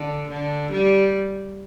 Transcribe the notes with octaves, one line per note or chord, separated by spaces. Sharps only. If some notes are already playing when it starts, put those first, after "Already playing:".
Already playing: D3
D3
G3